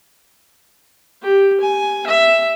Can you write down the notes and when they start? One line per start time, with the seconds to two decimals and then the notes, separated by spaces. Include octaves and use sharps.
1.22 G4
1.61 G#5
2.07 E5